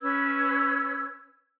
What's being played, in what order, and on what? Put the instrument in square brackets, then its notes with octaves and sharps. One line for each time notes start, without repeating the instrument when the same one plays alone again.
[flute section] C#4 B4 E6 G#6